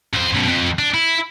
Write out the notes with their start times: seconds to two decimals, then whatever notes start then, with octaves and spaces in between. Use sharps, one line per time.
0.13 F2 C5
0.35 F#2 B2
0.48 F2
0.79 D4
0.94 E4